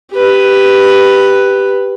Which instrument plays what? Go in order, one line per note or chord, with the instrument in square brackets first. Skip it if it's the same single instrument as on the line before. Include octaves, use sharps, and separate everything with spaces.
[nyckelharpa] G4 B4